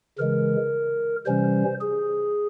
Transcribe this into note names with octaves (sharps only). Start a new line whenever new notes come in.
C#3 E3 G#3 A#4
C3 E3 G3 C#4 C5
G#4